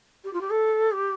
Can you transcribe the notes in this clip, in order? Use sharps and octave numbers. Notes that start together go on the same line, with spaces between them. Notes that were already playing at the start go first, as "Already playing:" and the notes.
G4
F4
G4
A4
G4